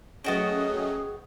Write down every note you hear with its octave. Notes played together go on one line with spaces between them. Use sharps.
F#3 A3 B3 C#4 F#4 G#4 D#5 G5